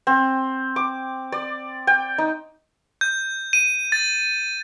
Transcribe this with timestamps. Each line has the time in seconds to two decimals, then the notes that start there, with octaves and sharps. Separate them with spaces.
0.07 C4
0.76 D6
1.32 D5
1.87 G5
2.18 D#4
3.01 G6
3.53 D#7
3.92 A6